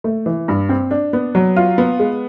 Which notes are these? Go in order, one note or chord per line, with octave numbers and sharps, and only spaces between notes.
A3
E3
G2
C4
D4
B3
F#3
F4
B3
G#3